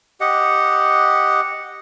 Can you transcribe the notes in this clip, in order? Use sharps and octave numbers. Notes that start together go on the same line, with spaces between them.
G4 D#5 F#5